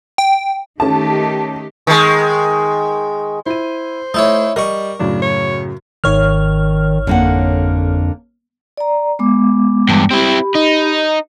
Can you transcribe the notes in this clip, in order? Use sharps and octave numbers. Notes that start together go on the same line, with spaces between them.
G5
D#3 A3 C#4 G4 A5
D#3 G#3
E4 C5 D#7
A3 D#4 E4 C#5
G3 A#4 D#5 C#6
F#2 A2 C#3 D4
C#5
G#1 D#3 C#5 F6
F2 D3 A#3 F#5
D5 A#5
G#3 B3 D6
E2 G2
C4 E4 G4 B5
D#4